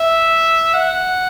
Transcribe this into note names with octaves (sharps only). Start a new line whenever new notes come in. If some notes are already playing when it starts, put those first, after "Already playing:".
Already playing: E5
F#5